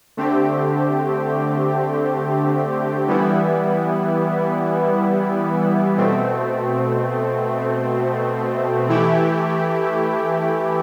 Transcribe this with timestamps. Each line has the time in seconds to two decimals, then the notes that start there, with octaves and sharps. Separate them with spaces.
0.17 D3 A3 C4 G4
3.07 E3 G3 B3 E4
5.97 B2 A3 C4
8.89 E3 A3 E4 G4